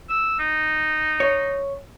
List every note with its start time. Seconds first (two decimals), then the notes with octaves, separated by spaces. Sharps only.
0.09 E6
0.39 D#4
1.20 C#5